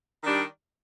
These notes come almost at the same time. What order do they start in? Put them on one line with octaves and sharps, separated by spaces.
D#3 D4 G3